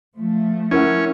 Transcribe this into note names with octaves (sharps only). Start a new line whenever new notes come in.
F3 A3
C#4 E4 A#4 F#5